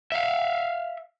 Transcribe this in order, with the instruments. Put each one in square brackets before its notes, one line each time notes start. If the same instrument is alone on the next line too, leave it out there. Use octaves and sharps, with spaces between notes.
[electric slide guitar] E5 F5